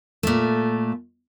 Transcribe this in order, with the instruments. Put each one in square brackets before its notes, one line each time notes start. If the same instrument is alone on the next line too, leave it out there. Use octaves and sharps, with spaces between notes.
[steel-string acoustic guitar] A#2 A3